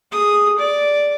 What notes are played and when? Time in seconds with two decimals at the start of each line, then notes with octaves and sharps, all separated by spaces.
0.11 G#4 D#6
0.58 D5